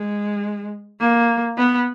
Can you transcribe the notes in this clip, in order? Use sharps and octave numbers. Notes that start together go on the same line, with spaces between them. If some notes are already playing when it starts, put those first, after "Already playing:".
Already playing: G#3
A#3
B3